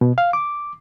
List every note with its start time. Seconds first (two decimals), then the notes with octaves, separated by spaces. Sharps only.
0.01 B2
0.18 F5
0.33 D6